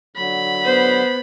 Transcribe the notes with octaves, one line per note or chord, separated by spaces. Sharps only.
D3 F#3 B5
B3 C5